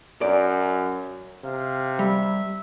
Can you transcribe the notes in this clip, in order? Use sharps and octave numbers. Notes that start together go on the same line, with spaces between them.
F#2 D5
C3 F5
G3 E5